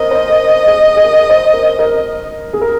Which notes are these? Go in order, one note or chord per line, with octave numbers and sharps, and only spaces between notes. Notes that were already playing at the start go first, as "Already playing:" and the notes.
Already playing: A#4 C5 D#5
C5
A#4
G#4
G#4
A#4
C5
A#4
A#4
G#4
A#4